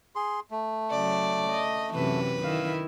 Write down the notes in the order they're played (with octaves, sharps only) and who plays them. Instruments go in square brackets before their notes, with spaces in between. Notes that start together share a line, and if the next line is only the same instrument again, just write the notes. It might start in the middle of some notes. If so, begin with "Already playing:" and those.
[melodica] G#4 C6
A3
[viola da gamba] C#3 F#3 [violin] D5
[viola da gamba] D#5
[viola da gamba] F#2 C3 E3 [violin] B4
[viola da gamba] D#3 E4 [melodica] F5